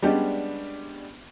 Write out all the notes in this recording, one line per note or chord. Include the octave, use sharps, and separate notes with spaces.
G3 G#3 B3 C#4 D4 G4